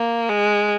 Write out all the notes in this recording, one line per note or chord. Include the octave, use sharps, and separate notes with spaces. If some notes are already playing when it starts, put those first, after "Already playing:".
Already playing: A#3
G#3